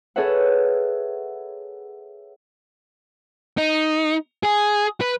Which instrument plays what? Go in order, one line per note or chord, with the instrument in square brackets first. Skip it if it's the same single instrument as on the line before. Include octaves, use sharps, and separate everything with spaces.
[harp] G#4 A4 B4 C#5 E5 F#5
[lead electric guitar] D#4
G#4
B4